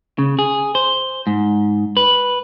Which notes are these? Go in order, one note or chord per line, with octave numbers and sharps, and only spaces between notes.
C#3
G#4
C5
G#2
B4